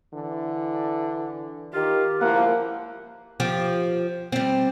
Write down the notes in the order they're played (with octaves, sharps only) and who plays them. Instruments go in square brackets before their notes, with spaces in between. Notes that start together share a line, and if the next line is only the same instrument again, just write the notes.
[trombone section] D3 E3
[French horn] D#3 [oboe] F4 [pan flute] G4
[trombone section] C#2 F3 E4 [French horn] A#3 [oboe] F#5
[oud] F3 G4
G3 C4